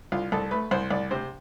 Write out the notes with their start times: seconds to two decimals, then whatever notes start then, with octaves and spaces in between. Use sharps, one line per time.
0.12 C2 F4
0.32 C2 A4
0.51 A3 B4
0.71 C2 C5
0.91 C2 D5
1.11 C3 C5